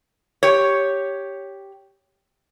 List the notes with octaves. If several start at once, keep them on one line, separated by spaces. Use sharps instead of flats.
G4 C#5